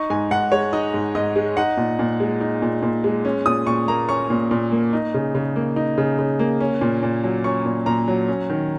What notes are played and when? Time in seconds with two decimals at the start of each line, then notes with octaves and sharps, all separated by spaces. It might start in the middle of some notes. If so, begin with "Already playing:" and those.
Already playing: D#4 C#6
0.10 G#2 G#5
0.31 G#2 F#5
0.52 G#3 C#5
0.73 D#4 D#5
0.94 G#2
1.15 G#2 D#5
1.36 G#3
1.57 D#4 F#5
1.77 A#2
1.99 A#2
2.20 G#3
2.41 D#4
2.62 A#2
2.83 A#2
3.04 G#3
3.25 C#4
3.46 A#2 D#6
3.67 A#2 C#6
3.88 A#3 A#5
4.09 C#4 C#6
4.30 A#2
4.51 A#2
4.72 A#3
4.93 D#4
5.14 C#3
5.35 C#3
5.56 A#3
5.76 D#4
5.98 C#3
6.19 C#3
6.39 A#3
6.61 C#4
6.81 A#2
7.03 A#2
7.24 F#3
7.44 C#4 C#6
7.66 A#2
7.86 A#2 A#5
8.08 F#3
8.28 C#4
8.50 D#3